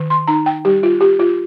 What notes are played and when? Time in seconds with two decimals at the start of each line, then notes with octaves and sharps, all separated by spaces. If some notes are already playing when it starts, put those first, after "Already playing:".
Already playing: D#3
0.10 C6
0.27 D#4 A#5
0.46 G5
0.65 G3 G4
0.83 F4
1.01 F4 G4
1.19 F4